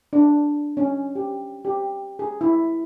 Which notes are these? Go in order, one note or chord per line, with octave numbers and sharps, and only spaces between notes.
D4
C#4
G4
G4
G#4
E4